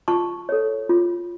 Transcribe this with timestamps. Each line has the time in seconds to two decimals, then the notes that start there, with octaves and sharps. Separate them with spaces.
0.08 F4 A5 C#6
0.49 A4 C#5
0.89 F4